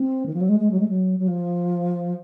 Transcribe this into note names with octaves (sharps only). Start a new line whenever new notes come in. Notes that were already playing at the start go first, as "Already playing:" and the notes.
Already playing: C4
D#3
F3
F#3
G#3
G#3
F#3
G#3
F#3
F#3
F3